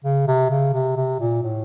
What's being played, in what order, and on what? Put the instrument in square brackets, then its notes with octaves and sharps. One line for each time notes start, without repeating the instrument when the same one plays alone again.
[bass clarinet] C#3
C3
C#3
C3
C3
A#2
A2